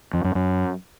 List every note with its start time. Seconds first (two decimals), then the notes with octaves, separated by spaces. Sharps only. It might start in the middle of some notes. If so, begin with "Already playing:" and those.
0.13 F2
0.24 F#2
0.35 F#2